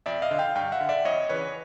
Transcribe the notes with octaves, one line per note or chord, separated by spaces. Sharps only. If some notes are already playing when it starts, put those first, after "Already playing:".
F2 D5 E5
D#5 F5
D3
F5 G5
G2 F5 G5
E5 F#5
D3
D5 E5
F2 C#5 D#5
C#3 E3 B4 C#5